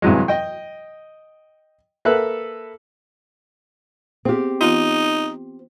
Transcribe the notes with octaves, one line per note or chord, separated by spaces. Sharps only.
G2 C3 E3 F#3 G#3
D#5 G5
A#3 A4 B4 E5 F#6
B3 C4 G4 G#4
E3 B3 D#4 F4